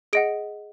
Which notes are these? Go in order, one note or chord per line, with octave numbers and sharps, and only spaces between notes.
G#4 D#5 F#5 D7